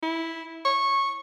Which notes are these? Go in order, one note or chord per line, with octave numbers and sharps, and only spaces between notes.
E4
C#6